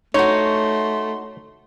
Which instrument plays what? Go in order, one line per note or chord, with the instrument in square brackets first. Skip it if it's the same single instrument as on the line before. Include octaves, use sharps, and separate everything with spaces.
[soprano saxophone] A3 [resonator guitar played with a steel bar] D#4 F#4 [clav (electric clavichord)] C#5 [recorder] C6